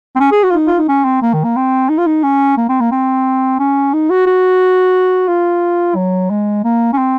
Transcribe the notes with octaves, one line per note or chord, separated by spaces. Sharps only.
C4
C#4
G#4
F#4
F4
D#4
F4
D#4
C#4
C4
A#3
D#3
A#3
C4
D#4
F4
D#4
C#4
A#3
C4
A#3
C4
C#4
D#4
F#4
F#4
F4
F#3
G#3
A#3
C#4
C4